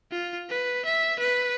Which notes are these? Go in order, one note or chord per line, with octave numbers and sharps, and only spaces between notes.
F4
B4
E5
B4